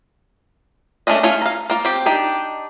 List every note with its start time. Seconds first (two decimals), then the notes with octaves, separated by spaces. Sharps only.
1.07 A3 A#3 C#4 D4 D#5
1.23 A3 C#4 F4 C#5 F5
1.42 F5 A#5
1.70 A#3 F4
1.85 C4 G4
2.06 D4 D#4 G4